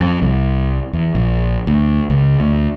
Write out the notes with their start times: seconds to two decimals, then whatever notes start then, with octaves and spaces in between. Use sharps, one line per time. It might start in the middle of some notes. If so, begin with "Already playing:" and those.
0.01 F2
0.22 C2
0.93 E2
1.15 A#1
1.67 D2
2.10 C#2
2.40 D2